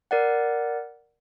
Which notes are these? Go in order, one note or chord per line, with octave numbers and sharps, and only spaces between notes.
A#4 D5 F#5